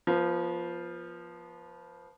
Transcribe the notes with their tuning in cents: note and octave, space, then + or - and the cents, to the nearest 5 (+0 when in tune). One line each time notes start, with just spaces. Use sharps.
F3 +0 B3 -30